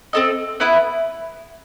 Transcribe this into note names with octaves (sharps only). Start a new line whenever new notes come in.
C4 D#4 A4 D#5
B3 E4 B4